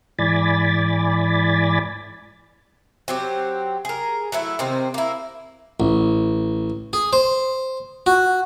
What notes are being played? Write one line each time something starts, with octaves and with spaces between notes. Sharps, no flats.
G#2 E3 D5 G#5 B5 A6
F#3 C4 G4
G#4 A#4
F#3 A3 E4
C3 D#3 C4
A#3 E4
A1
G#4
C5
F#4